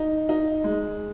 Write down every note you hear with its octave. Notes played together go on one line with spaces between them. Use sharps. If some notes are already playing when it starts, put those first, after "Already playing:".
Already playing: D#4
D#4
G#3